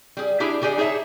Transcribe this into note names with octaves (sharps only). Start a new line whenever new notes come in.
G3 G#4
D4 E4 G4 G#4
D3 G4 G#4 D5
D#4 G#4 C#5 E5 A5